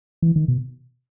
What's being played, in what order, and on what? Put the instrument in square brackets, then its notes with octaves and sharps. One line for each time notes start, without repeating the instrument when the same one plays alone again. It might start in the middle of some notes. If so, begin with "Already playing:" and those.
[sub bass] E3
D#3
B2